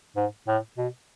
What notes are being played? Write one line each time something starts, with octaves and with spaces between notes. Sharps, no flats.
G#2
A2
B2